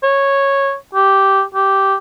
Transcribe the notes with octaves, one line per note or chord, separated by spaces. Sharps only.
C#5
G4
G4